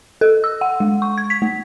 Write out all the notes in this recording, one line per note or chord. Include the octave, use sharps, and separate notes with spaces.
A4
E6
F#5
G#3
C#6
G#6
B6
A3